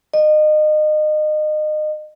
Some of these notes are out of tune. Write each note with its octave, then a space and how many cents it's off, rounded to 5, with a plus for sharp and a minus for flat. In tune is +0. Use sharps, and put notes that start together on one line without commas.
D#5 -30